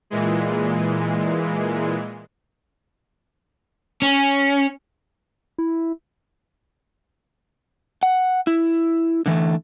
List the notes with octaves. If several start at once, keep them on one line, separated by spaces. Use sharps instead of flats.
A#2 E3 G#3
C#4
E4
F#5
E4
D3 E3 A3